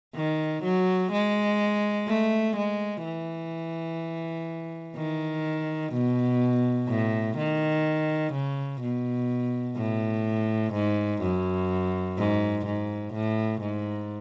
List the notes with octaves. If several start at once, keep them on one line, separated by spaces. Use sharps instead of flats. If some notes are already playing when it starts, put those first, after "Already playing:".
D#3
F#3
G#3
A3
G#3
E3
D#3
B2
A2
D#3
C#3
B2
A2
G#2
F#2
G#2
G#2
A2
G#2